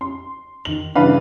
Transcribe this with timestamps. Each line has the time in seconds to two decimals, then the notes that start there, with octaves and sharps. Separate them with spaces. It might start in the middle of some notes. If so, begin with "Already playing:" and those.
0.01 C6
0.65 D#3 F#7
0.95 G2 C#3 E3 D4 B4 F5